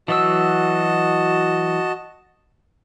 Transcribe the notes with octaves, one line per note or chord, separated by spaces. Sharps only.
E3 F#3 F#4 D#5 A5 E6